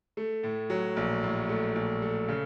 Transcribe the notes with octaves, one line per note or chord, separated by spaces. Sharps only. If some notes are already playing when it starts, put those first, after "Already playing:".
A3
A2
F#3
A#1
A2
A3
A#1
A3
C#3